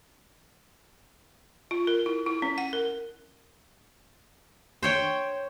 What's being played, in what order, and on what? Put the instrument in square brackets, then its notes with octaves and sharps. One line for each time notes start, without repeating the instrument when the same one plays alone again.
[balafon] F4
A#4
E4
E4
C#4
F#5
A#4
[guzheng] C5 C#5 G5